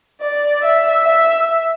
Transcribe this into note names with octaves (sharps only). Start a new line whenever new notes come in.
D5
E5
E5